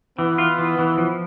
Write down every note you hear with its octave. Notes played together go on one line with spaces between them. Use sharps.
E3 B3
F4
E3
E3
F3